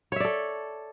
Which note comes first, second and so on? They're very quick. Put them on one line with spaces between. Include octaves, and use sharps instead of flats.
C#5 E5 D5 A4